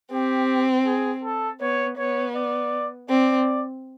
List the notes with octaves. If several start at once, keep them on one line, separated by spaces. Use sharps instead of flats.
C4 G4
G#4
A4
B3 C#5
B3 C#5
D5
C4 D5